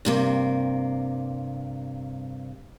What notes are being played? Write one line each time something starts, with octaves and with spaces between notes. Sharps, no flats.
G2 C3 A#3